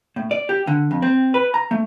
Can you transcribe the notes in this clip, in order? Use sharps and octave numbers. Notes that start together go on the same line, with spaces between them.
A2
D5
G4
D3
F2
C4
B4
A#5
A3